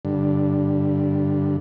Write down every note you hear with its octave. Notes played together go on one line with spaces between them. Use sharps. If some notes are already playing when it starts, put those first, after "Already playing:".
G2 D3